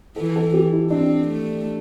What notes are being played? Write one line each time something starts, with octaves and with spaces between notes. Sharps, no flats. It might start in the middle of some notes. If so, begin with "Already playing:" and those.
E3 A4
A4
G4
E4
C4 D4
A3